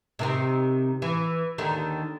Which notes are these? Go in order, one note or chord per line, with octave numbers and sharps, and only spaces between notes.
C3 D#3 C4
E3
D#2 D3 D#3